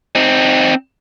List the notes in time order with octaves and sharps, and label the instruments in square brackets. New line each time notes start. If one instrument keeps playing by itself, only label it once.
[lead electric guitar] C4 D#4